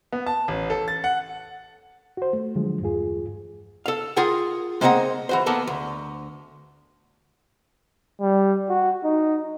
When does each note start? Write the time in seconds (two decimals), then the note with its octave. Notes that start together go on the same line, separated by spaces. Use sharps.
0.13 B3
0.26 A5
0.48 A1
0.70 A4
0.88 A6
1.04 F#5
2.17 F#4 C5
2.33 A3
2.56 D3 F3 F#3 G#3
2.81 E2 G2 F4 G#4
3.86 A4 F5
4.17 F4 G#4 A#4 F#5 G5
4.81 G#3 A#3 C4 D#4 F#5 A#5
5.29 E3 F#4 C5
5.46 A#3 B3 A4 A#4
5.67 D2
8.21 G3
8.69 F#4
9.04 D#4